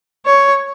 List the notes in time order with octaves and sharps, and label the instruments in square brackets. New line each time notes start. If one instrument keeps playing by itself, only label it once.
[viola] C#5